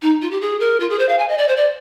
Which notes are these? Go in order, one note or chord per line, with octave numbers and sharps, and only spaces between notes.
D#4
F4
G4
G#4
A#4
F4
G#4
C5
F5
G#5
D#5
D5
C5
D5